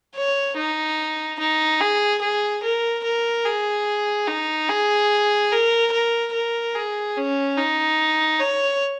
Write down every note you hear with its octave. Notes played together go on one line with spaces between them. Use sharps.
C#5
D#4
D#4
G#4
G#4
A#4
A#4
G#4
D#4
G#4
A#4
A#4
A#4
G#4
C#4
D#4
C#5